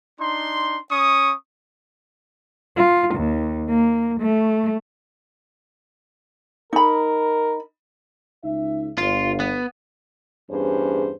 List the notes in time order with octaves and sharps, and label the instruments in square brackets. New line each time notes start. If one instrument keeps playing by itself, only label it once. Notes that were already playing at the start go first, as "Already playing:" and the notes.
[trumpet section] D4 D#4 C6
C#4 C#6 D#6
[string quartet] F4
D#2
A#3
A3
[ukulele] D#4 B5 [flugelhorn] A#4
[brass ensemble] C#2 D#4 E5
[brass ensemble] G1 [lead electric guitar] F4
[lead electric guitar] B3
[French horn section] E2 G2 C#4 G#4 C5